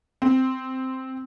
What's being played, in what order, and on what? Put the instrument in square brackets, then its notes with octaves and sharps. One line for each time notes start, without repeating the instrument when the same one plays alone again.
[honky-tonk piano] C4